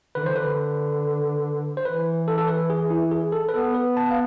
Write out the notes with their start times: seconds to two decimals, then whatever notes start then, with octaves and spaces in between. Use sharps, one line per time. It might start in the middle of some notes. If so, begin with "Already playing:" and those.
0.15 D3 B4
0.23 E3
0.26 C5
0.32 D3 B4
1.77 C5
1.85 E3 B4
2.28 A4
2.38 A4
2.48 B4
2.70 G#4
2.90 E4
3.11 G#4
3.32 A4
3.48 B4
3.54 B3 A4
3.75 B4
3.97 A5
4.11 F5